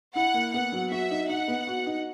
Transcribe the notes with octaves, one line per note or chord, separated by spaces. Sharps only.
E4 F#5
A#3
B3 F#5
F#3
F#4 E5
D#4
D#4 F#5
B3
F#4
D#4